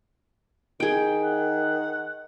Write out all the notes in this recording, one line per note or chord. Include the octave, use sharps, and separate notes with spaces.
D#3 G#4 G5
F#5